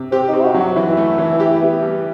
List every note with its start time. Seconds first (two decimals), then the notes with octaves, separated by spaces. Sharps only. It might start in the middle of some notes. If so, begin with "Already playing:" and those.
Already playing: C3
0.12 C4 G4
0.28 D#4
0.34 C4
0.40 E4
0.44 F#4
0.54 F#3
0.60 F#4
0.76 E3 E4
0.97 A3
1.18 E3
1.40 G4
1.61 B3
1.82 G3